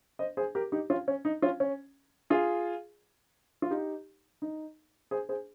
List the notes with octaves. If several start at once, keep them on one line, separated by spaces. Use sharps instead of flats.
C5 D#5
G#4 C5
G4 A#4
D#4 G4
C#4 F4
C#4
D#4
C#4 F4
C#4
F4 G#4
F4
D#4 G4
D#4
G#4 C5
G#4 C5